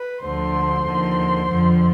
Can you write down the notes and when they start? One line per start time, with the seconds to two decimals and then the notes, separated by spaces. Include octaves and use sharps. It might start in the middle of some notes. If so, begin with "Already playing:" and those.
Already playing: B4
0.23 D2 D3 F3 C5 C6
0.86 D#2 D3 F3
1.49 F2 D3 F3